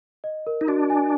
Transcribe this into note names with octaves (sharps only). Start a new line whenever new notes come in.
D#5
A#4
D#4
D4 F#4
G#5